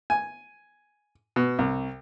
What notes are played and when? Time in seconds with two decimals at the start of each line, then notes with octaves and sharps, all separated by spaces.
0.10 G#5
1.36 B2
1.59 C2